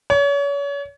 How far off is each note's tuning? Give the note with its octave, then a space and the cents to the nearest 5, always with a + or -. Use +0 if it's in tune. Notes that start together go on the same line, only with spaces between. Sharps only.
C#5 +35